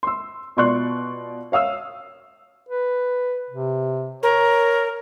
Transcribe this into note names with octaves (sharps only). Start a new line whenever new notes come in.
C6 E6
B2 F4 D5 C6 C#6 F#6
C#5 F5 D#6 E6
B4
C3
A#4 C#5